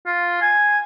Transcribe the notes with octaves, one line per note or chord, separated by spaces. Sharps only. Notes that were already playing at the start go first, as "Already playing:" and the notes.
F4
G#5